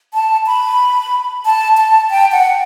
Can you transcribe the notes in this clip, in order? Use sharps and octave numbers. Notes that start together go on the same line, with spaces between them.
A5
B5
A5
A5
G5
F#5